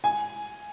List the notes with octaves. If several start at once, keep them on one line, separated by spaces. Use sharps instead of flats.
G#5